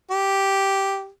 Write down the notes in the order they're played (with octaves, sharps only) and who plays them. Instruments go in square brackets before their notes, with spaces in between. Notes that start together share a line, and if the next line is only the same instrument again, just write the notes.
[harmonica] G4